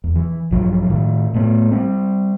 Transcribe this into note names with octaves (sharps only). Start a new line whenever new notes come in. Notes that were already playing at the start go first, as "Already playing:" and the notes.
E2
E3
A#1 G2 F3 F#3
A2 D#3
A2 A3 B3
G3 A3 C4